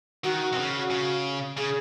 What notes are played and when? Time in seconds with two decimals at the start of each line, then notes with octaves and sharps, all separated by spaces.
0.24 D#3 F#4
0.53 C3
0.58 C#3
0.91 C#3
1.57 C#3 G#4